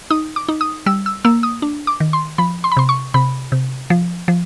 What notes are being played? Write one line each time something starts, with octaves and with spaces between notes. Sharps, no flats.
D#4 D#6
D6
D#4
D#6
G3 E6
E6
A#3 E6
D#6
D4
D6
D#3
C6
F3 B5
C6
B5
C3 C6
C#6
C3 B5
C3
F3
F3